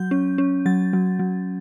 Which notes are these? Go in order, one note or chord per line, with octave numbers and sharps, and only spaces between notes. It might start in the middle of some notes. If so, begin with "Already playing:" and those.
Already playing: F#3 G6
C#4
C#4
F#3 A6
F#3
F#3